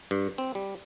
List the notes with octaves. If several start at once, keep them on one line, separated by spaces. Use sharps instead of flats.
G2
C4
G3